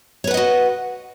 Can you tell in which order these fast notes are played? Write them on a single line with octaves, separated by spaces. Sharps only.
C#5 B4 F#5 D#5 F#4